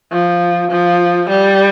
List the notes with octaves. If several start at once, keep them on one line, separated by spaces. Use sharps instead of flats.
F3
F3
G3